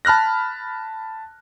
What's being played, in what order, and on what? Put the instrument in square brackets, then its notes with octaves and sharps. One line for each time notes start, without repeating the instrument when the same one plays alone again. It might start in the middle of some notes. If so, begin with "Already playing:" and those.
[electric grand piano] A5 B5 F6 F#6 A#6